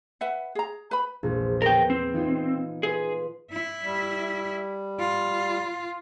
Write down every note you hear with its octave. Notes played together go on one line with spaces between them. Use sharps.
B4 E5 F#5
G#4 A#5
B4 B5
A#1 E2 G#3
B3 A#4 G5
C4
E3 D#4 F4
G#4 B4 C6 B6
E4 E5
G3
F4